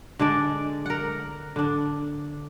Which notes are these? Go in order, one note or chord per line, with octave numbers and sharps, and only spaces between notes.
D3 G#3 D4 D5
A#4 F#5
D3 D4